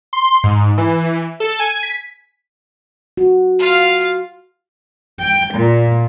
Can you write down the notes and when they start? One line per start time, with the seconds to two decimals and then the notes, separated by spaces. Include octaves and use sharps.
0.13 C6
0.44 G#2
0.78 E3
1.40 A4
1.59 G#5
1.83 B6
3.17 F#4
3.59 F4 F5
5.19 G5
5.54 A#2